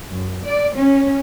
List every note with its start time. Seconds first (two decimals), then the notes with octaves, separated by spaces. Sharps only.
0.10 F#2
0.44 D5
0.76 C#4